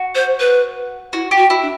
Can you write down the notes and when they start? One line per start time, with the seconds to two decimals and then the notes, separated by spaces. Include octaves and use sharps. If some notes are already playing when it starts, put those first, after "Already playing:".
Already playing: F#4
0.15 C5
0.40 B4
1.13 E4 F#4
1.31 G4
1.37 F#4
1.50 E4
1.62 D4